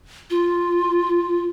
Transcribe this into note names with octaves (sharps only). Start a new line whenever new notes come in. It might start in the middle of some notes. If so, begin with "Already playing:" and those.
F4